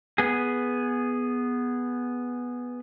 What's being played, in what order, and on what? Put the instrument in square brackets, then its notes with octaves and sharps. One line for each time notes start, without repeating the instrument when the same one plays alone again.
[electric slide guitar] B3 G#4